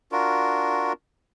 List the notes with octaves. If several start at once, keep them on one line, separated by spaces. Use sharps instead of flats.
D4 F4 F#4 A#4